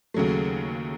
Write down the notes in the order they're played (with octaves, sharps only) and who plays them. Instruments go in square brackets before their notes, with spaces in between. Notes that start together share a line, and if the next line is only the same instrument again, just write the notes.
[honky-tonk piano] D#2 C#3 F#3 A3